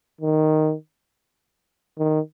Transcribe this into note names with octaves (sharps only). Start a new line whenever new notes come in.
D#3
D#3